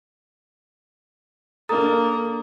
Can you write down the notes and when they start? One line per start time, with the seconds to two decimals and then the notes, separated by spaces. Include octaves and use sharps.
1.69 A#3 D4 A4 A#5 D#6 A6